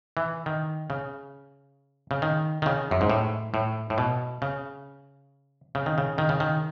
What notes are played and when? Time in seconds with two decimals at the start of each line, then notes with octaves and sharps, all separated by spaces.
0.17 E3
0.46 D#3
0.90 C#3
2.11 C#3
2.22 D#3
2.62 D#3
2.66 C#3
2.91 F#2
3.01 G#2
3.10 A2
3.54 A2
3.90 A2
3.98 B2
4.42 C#3
5.75 C#3
5.86 D#3
5.98 C#3
6.18 D#3
6.29 C#3
6.40 D#3